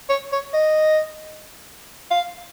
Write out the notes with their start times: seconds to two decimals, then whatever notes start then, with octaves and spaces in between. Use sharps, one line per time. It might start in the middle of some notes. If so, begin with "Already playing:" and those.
0.09 C#5
0.32 C#5
0.54 D#5
2.11 F5